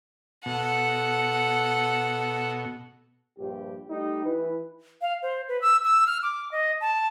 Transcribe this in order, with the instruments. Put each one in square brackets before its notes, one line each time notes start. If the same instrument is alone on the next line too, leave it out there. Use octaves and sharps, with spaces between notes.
[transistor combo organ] B2 [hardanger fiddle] A4 F#5
[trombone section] A#1 G2 G4
G3 A3 D#4 G4
E3 B4
[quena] F5
C5
B4
E6
E6
F6
D6
D#5
A5